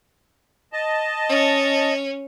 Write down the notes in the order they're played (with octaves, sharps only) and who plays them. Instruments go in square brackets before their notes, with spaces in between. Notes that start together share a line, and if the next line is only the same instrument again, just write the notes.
[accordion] D#5 A5
[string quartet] C#4